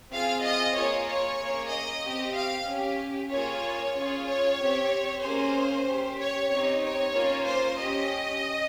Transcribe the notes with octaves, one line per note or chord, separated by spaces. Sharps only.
C4 F4 G#4 F5
D#5
A#3 F4 G#4 C#5
C#5
A#3 C#4 G#4
D#5
C4 G4
F5
C#4 G4
A#3 F4 G#4 C#5
C#4 F4 G#4
C#5
C4 G4
A#3 C#4 G#4 C5
C#4 G4
C#5
C4 D#4 G4 C#5
C#5
A#3 C#4 F4
C5
C#4 G4 D#5